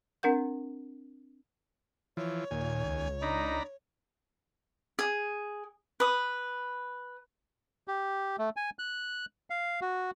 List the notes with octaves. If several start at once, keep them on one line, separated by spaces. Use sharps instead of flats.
C4 D4 A#4 F#5 G6
E3 F3 C#5
D#2 A#2 G#5
C#2
D4 D#4 A#5 B5
G#4
B4 D#6
G4
A3
G#5
F#6
F5
F#4